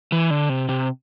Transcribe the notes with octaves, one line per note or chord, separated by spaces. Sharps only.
E3
D3
C3
C3